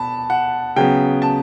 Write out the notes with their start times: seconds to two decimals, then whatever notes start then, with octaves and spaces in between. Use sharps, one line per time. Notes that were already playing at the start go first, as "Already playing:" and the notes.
Already playing: B2 A5 B5
0.30 F#5
0.76 C#3 F#3 B3 G5
1.22 A5